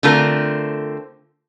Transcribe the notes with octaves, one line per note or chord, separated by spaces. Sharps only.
D3 A3 C4 F4 A#4